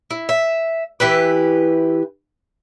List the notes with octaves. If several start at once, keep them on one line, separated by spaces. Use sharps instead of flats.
E4
E5
E3 E4 G4 B4